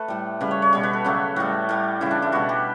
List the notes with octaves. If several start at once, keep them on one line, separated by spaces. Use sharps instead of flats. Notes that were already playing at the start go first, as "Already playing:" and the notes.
Already playing: A3 A4 B4
A2 G3
C#3 G3 B4
C#5
C#5
B2 G3 C#5
B4
A4
C#3 F#3 A3
A2 G3 F#4
A2 G3
C#3 E3 G3 E4
D4
E4
B2 G3 F#4
G4